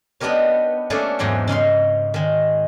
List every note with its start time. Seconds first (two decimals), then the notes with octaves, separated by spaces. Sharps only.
0.20 B3 D4 D#4 G4 A#4 C#5
0.90 A3 A#3 C#4 D4 G#4 A4
1.19 E2 G#2 F#3 C5 G5
1.48 C#3 D#4 F5 C6
2.14 D#3 G#3